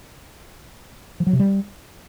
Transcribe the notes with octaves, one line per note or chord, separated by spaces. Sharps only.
F3
F#3
C3
G3